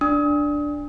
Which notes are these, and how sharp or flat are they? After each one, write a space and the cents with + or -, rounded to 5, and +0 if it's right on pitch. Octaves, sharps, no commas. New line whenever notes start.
D4 +0 D#6 +35